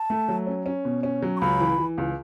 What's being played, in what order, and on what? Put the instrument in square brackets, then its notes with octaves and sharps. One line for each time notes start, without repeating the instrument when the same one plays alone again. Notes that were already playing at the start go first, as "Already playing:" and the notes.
Already playing: [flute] A5
[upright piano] A3
F#3
C#4
C#4
B2
C#4
F#3
[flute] C#6
[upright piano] C#2 [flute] B5
[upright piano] E3
E3
C#2